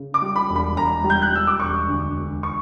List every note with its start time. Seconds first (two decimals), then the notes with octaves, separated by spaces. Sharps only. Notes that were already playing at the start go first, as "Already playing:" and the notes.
Already playing: C#3
0.14 D6
0.22 G3
0.36 B5
0.50 E1
0.56 B5
0.77 E1 A#5
1.04 G3
1.10 G6
1.22 F#6
1.32 G3 E6
1.47 D6
1.60 E1 C#6
1.88 D2
2.16 E1
2.43 C#6